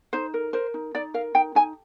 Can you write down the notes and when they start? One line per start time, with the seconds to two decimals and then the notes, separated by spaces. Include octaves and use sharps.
0.13 D#4 C5
0.34 A#4
0.53 A#4 C5
0.74 D#4
0.95 D#4 D5
1.14 A#4 F5
1.35 D#4 G5
1.55 D#4 G#5